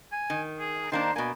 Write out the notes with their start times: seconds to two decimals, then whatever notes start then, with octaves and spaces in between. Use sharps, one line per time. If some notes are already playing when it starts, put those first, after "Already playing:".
0.12 G#5
0.30 D#3
0.59 G#4
0.92 D#3 A#3 D4 C5
1.16 B2 A#3 G#5